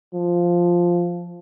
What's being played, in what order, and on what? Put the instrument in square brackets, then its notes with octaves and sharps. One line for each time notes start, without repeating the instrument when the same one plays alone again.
[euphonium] F3